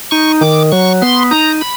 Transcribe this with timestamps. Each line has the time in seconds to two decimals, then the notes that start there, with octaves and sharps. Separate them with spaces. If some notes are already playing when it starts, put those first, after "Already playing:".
0.11 D#4 C#6
0.41 D#3 D6
0.72 F#3 C#6
1.02 B3 C6
1.31 D#4 A#5
1.61 B5